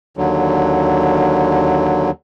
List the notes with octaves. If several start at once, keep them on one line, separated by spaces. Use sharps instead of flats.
D#2 D3 F#3